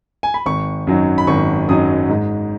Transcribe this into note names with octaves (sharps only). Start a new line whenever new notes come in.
G#5
B5
G#1 C#6
F#2 F#3 D#4
B5
G#1 C#6
F#2 F#3 D#4 D#6
G#2